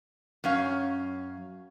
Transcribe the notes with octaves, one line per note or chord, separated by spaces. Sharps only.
F#2 C#4 F5